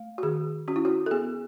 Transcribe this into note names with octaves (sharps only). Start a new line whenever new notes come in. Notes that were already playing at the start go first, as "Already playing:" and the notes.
Already playing: A3
F#4
D#3 G#4
C#4 F#4
E4
F#4
A4
B3 G#4